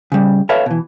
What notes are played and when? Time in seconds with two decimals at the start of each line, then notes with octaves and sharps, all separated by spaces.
0.12 C#3 G3
0.49 A4 B4 C#5 E5 F5 A5
0.66 B2 E3